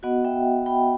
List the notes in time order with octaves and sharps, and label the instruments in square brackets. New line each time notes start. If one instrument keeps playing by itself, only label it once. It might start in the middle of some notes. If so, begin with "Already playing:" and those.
[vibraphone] B3 F#4 D#5 F#5
E5 G5
G5 B5